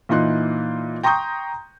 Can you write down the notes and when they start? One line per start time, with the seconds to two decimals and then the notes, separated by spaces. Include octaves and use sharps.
0.09 A#2 E3 D#4 C6 F#6
1.03 G5 A#5 C6 C#6 D#6 G6